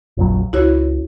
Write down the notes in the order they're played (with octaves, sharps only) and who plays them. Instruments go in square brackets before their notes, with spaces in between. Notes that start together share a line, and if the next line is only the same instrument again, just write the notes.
[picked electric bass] F1 A#1 F#3
[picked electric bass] C#2 [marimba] E4 F#4 C#5